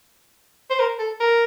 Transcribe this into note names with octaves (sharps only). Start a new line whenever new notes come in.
C5
A#4
A4
A#4